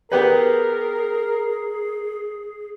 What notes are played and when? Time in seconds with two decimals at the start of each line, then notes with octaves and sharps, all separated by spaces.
0.12 B3 G4 G#4 A#4 B4